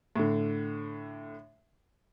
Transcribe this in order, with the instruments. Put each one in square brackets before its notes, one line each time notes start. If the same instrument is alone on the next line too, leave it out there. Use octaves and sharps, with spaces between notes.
[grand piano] A2 D3